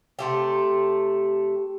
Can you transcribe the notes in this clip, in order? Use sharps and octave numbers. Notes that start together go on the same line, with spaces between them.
C3 A3 G4